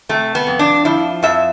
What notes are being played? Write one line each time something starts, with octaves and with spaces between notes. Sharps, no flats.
C3 A3
B3
F2
D4
F3 E4
F2 E5